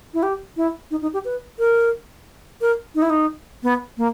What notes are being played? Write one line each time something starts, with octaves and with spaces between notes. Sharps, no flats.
E4
G4
E4
D#4
D#4
G4
B4
A#4
A#4
D#4
E4
D#4
B3
A#3